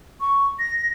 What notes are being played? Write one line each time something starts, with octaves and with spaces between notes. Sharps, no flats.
C#6
A#6